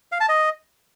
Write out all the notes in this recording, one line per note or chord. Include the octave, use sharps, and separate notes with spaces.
F5
A5
D#5